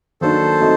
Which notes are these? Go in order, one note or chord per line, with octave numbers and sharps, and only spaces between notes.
D#3 F#3 A#3 D4 A4 C5
F#3 A3 C4 D#4